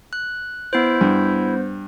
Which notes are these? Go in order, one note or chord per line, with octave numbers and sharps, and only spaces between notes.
F#6
B3 E4 C5
G2